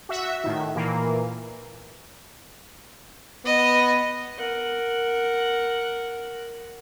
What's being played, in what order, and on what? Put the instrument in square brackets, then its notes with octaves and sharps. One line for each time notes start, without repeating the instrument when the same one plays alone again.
[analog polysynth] F#4 E5
A2 D#3
A#2 E3 A#3
[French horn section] B3 [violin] D#5
[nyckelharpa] A#4 F#5